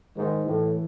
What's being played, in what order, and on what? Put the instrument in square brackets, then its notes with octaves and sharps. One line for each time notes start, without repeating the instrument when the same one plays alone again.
[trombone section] G#2 [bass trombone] D#3
[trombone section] A2 [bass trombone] E3